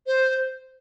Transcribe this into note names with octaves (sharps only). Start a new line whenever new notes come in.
C5